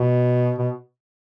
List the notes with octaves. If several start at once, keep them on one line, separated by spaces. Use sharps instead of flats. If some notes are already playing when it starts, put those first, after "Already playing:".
Already playing: B2
B2